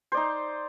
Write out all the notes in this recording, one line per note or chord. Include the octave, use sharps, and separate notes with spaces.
D#4 C5 D5